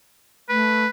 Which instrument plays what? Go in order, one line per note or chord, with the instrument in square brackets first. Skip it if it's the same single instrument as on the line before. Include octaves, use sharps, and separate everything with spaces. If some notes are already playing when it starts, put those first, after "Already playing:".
[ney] A3 [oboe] B4